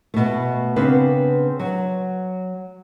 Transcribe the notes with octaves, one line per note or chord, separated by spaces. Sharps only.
B2 A3
C#3 B3 C4 D4 B4
F#3